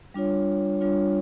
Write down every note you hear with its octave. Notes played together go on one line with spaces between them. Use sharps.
G3 D4 F4 C#5
G3 D4 F4 C#5